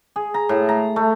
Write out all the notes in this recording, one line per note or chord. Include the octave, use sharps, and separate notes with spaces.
G#4
A#5
A2
A#5
A3